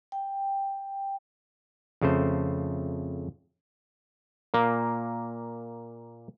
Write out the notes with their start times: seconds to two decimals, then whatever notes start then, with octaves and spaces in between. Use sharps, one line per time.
0.12 G5
2.01 F2 C#3 A3 C5
4.54 A#2 A#3